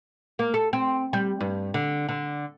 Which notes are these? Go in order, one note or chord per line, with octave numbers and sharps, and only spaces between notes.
A#3
A4
C4
G3
G2
D3
D3